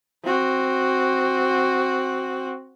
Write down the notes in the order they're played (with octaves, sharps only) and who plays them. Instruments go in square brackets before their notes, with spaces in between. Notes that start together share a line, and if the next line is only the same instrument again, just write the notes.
[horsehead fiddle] C4 F#4